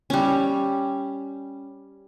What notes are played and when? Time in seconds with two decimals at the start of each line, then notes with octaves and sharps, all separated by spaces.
0.10 G3 C#4